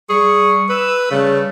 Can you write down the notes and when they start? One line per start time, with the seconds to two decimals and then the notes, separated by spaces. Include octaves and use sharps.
0.10 G3 G#4 C#6
0.69 B4 E6
1.11 C#3 G3 A3